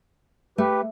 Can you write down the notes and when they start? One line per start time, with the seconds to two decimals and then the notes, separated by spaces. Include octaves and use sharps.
0.58 A3 G4 B4